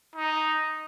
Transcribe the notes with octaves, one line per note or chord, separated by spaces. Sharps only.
D#4